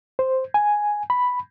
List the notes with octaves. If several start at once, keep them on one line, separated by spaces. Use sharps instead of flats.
C5
G#5
B5